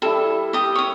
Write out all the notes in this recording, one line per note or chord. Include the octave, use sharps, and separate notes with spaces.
G3 E4 A4
G4 D#6
C#5 D#6